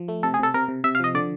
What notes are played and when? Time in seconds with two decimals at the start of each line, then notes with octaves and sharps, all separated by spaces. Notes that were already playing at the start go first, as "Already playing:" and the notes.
Already playing: F3
0.08 A3
0.23 C3 A4
0.34 G#4
0.39 C3 A4
0.54 C3 A#4
0.68 C3
0.84 C3 E5
0.95 F5
1.00 F3 D#5
1.15 D3 D5